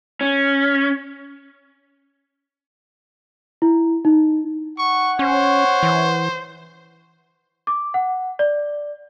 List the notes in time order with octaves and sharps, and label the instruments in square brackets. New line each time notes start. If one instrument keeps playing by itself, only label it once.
[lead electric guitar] C#4
[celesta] E4
D#4
[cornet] F#5 [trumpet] C#6
[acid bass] C#4 [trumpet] C5 [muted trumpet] C#5
[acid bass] E3
[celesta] D6
F#5
D5